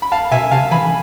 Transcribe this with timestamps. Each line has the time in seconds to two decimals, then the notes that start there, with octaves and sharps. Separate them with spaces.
0.02 B5
0.12 F5 A5
0.31 B2 E5 G#5
0.51 C3 F5 A5
0.71 E3 G#5 B5